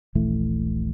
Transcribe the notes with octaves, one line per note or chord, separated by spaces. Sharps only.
D#1 A#1 E3 A3